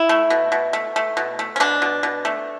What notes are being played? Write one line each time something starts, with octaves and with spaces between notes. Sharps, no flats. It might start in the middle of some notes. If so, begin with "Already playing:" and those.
Already playing: E4
A3
B2
B2
A3
A3
B2
A3
C#4
B2 D4
B2
B2
A3